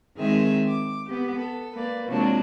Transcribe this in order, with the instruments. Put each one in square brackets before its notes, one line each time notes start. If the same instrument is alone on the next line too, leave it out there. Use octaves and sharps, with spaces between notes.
[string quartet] D#3 G#3 C4 G#4 E5 F6
D6
B3 G4
A4
A#3 B4 D5
C3 F3 F#3 G#3 A#3 D4